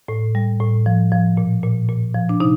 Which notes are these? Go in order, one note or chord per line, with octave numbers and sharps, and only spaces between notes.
A2
G3
A2
F3
F3
A#2
A#2
A#2
F3
D4
C3 D#4